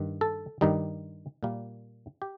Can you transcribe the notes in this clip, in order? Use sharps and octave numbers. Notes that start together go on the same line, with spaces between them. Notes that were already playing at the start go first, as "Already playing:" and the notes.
Already playing: G2 D#3
A4
G2 D#3 G3 D#4
A#2 G3 A#3
G4